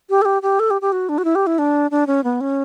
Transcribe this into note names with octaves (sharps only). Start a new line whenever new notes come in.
G4
A4
G4
G4
A4
G4
G4
F#4
D4
F#4
E4
G4
E4
D4
D4
C#4
B3
C#4